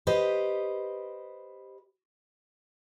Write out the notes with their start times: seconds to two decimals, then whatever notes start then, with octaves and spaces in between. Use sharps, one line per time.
0.07 G4 B4 C5 D#5